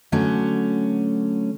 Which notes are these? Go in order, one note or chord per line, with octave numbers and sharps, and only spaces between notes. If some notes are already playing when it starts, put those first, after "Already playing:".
D3 F#3 A3 C#4